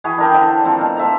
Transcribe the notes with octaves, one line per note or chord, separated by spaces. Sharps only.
E3 F#4 G#4
D4 A#4 G5
D3 C5 E5
F3 C4 F4
B2
C5 E5 A5 A#5